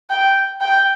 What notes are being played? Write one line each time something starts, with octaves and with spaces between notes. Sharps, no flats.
G5
G5